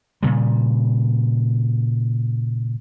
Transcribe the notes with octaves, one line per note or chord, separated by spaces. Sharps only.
A#2 C#3 G3